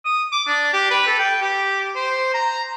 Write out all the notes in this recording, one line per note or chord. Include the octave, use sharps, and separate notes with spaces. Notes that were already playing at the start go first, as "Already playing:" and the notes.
D#6
D6
D4
G4
B4
A4
G5
G4
C5
A#5